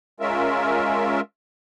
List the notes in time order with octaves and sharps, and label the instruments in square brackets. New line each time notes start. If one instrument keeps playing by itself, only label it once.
[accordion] G#3 C#4 F4 A#4 E5